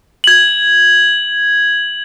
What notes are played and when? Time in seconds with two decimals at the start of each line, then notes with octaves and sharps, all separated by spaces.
0.24 G#6 F#7